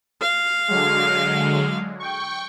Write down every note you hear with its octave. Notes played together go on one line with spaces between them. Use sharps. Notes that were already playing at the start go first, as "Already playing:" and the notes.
F5
D3 F#3 G#3
G5 C#6